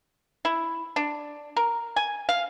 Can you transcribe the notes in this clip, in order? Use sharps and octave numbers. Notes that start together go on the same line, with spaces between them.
E4
D4
A#4
G#5
F5